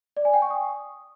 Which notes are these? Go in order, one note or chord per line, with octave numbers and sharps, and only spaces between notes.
D5
G#5
G5
C#6
D#6